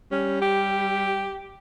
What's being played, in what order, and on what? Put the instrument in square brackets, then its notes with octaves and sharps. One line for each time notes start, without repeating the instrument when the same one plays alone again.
[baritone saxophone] G3 [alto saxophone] C#4
[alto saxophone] G4